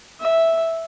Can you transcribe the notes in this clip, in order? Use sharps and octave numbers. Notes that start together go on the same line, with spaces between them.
E5